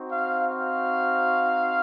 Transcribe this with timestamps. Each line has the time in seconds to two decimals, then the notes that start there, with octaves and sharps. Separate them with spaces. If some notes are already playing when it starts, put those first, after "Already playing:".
Already playing: C4 D#4 F#4
0.10 F5
0.49 F5